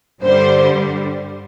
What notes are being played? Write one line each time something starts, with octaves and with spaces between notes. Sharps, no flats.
G2 D3 G3 C5